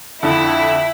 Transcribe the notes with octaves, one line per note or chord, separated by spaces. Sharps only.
F2 D3 E4